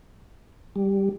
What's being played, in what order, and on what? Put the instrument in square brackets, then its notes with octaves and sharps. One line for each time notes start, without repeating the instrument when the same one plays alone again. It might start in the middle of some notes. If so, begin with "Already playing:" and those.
[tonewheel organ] G3